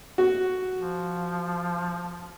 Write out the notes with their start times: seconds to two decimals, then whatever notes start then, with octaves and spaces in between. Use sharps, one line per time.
0.18 F#4
0.77 F3